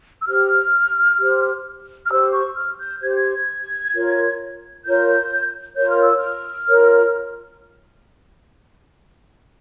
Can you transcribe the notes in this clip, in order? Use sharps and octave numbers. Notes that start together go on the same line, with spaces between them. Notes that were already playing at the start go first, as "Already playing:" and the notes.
E6
G4 C5 F6
G4 C5
F6
G4 C5 E6
C#6
F6
G6
G4 C5 G#6
G6
G#6
F4 A#4 C#5
F4 A#4 C#5 G6
F4 A#4 C#5 G6
F6
E6
F6
F4 A#4 C#5